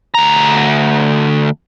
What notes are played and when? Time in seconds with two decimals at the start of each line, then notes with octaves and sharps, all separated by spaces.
0.15 D2 A#5